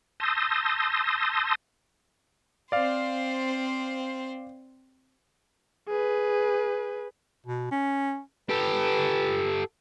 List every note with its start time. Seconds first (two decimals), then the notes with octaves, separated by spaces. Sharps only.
0.20 A5 C6 D#6 E6 G6 A#6
2.72 C4 C5 D5 F5
5.88 G#4 B4
7.47 B2
7.71 C#4
8.50 G4 A4 B4